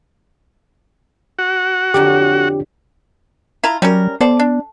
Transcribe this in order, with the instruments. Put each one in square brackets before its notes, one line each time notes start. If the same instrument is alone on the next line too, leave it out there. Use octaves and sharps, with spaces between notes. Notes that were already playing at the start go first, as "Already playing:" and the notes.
[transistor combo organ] F#4 F#5
[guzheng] F2 D3 F#3 [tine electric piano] G4
[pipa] E4 F4 A#5
[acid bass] F#3 [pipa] G3 C#4 A#4
[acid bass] B3 [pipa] A4 C5 D5
[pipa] D4